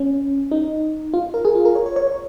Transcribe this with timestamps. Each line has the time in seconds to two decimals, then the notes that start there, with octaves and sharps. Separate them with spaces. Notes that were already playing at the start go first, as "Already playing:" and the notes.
Already playing: C#4
0.51 D#4
1.14 F4
1.34 A#4
1.45 G#4
1.55 F4
1.65 A#4
1.75 C#5
1.86 C#5
1.96 C#5
2.07 C#5